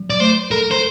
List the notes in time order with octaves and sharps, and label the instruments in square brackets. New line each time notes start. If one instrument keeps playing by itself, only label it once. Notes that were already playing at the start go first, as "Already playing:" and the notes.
Already playing: [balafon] F#3
[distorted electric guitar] D5
[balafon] A3 [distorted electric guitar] C5
[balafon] A4 [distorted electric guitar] A#4
[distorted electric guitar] C5